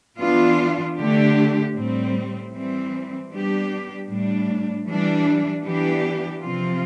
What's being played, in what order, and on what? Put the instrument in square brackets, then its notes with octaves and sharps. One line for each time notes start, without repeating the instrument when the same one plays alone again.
[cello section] E3 B3 D4 F4
D3 A3 D4 G4
A2 G3 C4
E3 G3 C4
G3 B3 D4 G4
A2 G3 D4
E3 G3 D4
E3 B3 D4 G4
C3 F3 C4 F4